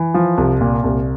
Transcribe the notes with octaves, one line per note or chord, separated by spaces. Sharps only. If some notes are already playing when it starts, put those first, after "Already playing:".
Already playing: E3
F3
C2
A#2
C2